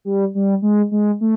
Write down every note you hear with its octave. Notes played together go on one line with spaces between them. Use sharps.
G3
G3
G#3
G#3
A3